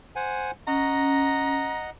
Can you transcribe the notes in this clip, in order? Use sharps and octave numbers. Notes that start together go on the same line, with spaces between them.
C5 F#5 G#5
C#4 D#5 F#5 A#5